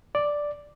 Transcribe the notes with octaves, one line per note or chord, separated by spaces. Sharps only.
D5